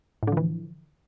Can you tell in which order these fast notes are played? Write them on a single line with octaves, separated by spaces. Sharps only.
A2 D3 F3 E3